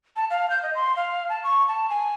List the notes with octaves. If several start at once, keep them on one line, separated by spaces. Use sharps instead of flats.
A5
F5
G6
D#5
C6
F5
A5
C#6
A5
G#5